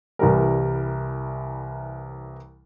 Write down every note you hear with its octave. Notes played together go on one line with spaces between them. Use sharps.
C2 E3 G3 A#4